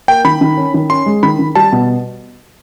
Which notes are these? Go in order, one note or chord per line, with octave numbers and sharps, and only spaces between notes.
A#3 G5
D#3 B5
D#3
C#4
D#3
C#4 C6
G#3
D#3 B5
D#3
G3 A5
B2